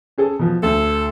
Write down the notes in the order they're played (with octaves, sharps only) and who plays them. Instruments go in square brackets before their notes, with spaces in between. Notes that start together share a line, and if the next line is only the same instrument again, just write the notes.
[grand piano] C#4 G#4 A4
B2 F3
[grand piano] D2 [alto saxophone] A4